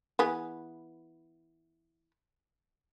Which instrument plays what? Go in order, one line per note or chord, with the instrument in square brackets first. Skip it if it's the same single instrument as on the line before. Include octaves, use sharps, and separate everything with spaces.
[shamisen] E3 B3 G#4